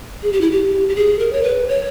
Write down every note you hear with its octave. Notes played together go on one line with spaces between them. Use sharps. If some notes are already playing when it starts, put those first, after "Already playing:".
G#4
G4
E4
G4
G4
G#4
A#4
C#5
B4
C#5